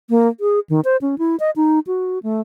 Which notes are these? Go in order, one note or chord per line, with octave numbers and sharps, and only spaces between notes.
A#3
G#4
D#3
C5
C#4
E4
D#5
D#4
F#4
A3